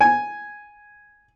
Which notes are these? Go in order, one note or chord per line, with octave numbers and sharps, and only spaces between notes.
G#5